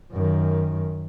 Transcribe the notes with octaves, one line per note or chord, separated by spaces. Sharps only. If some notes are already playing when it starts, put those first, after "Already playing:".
F#2 D#3